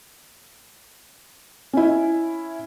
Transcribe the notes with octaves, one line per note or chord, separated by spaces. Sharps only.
C#4 E4